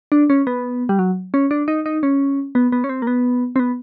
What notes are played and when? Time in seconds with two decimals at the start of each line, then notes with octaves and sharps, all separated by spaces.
0.12 D4
0.30 C#4
0.47 B3
0.89 G3
0.99 F#3
1.34 C#4
1.51 D4
1.68 D#4
1.86 D#4
2.03 C#4
2.55 B3
2.72 B3
2.84 C#4
2.89 C4
3.02 A#3
3.07 B3
3.56 C4
3.60 B3